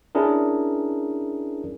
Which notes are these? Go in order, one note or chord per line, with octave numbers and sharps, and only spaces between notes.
C#4 D4 E4 G#4 A#4